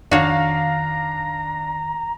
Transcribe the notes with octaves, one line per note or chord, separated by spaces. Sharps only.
F2 D#3 D4 F#4 C#5 F5 A#5